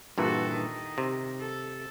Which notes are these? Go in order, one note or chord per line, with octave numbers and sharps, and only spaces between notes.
G2 A#2 E3 F#4 A4
D#3
C3
A4